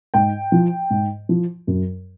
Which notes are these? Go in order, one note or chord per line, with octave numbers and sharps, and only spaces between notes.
G#2 G5
F3
G#2
F3
F#2